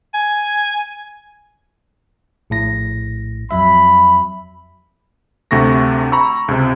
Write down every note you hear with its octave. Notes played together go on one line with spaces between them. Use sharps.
G#5
A#1 A2 A#6
F2 F#3 E5 B5
D2 C3 A3 C#6 A#6
A#5 B5 C#6 E6
C#2 C3